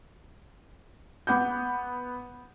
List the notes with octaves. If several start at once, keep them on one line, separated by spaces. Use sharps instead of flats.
B3 F#5 D6 G6